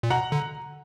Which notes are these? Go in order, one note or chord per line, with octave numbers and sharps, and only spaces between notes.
A#2
B2 F#5 A#5
D3